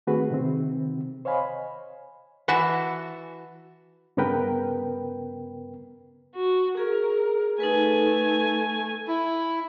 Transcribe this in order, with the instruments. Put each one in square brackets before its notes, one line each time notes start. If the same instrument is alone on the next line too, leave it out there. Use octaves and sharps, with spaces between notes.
[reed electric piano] D#3 A3 C4 F#4 G#4 B4
C3 D#3 C4
C5 C#5 D#5 F5 G#5 B5
[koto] E3 F#4 E5 A5
[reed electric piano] G2 C#3 B3 A#4 B4 G5
[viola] F#4
[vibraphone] G#4 [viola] A#4
[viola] A3 G#5 [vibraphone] D#4 A4 B4
[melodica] E4